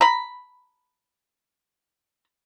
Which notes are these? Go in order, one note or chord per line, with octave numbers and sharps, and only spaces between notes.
A#5 B5